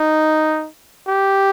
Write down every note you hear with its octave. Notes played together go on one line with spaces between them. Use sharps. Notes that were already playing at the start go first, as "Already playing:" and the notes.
Already playing: D#4
G4